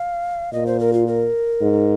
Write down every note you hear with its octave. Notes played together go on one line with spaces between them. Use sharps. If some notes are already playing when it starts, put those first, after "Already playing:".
Already playing: F5
A#2 D#5
C5
A#4
F4
A#4
G#2